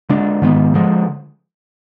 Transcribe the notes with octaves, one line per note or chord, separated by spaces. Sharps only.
D3 G#3 D4
G#2 D#3 G#3 B3
D3 F3 G#3